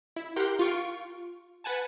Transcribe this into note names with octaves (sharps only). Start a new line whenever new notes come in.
E4
G4 A#4 F#5 G5 C6
F4 C#6 D7
B4 F#5 G#5 A5